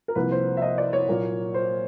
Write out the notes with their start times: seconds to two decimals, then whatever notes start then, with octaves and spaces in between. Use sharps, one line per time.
0.08 A#4
0.15 C2 C3 F3 A#3 B4
0.31 C5
0.57 E5
0.62 D#5
0.78 D5
0.93 C#5
1.09 A#2 F#3 A#3
1.54 C5